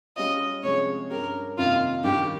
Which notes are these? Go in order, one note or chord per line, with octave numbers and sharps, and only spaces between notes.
G3 C#4 F4 D#5
C3 F3 G#3 C#4 G#4 C#5
G2 G3 C#4 G4 A#4
F2 C3 D#3 A#3 D#4 F4
D#2 D#3 G3 G4